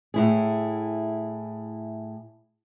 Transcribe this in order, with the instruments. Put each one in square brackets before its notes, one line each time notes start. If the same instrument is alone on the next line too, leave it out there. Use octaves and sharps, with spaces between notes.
[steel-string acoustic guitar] A2 E4 G#4